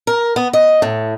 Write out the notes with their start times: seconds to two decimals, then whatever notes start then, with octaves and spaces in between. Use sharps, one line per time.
0.07 A#4
0.36 B3
0.53 D#5
0.82 A2